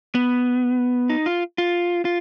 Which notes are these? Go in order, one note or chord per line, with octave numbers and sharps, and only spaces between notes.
B3
D#4
F4
F4
F4